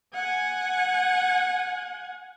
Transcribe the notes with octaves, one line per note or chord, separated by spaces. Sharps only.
F#5 G#5